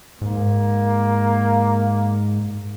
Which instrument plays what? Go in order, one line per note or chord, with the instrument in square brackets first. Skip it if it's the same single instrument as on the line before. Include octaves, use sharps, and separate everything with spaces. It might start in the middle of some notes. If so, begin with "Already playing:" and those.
[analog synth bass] G#2 [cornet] A#3